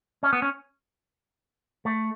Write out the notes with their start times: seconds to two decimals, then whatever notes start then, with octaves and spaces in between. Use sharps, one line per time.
0.23 C#4
0.33 B3
0.42 C#4
1.85 A3